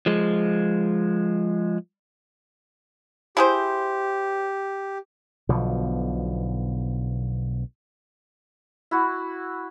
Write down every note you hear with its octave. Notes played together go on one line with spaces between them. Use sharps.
F3 G#3
E4 G4 G#4 C5
B1 B2 D3 F3
E4 F#4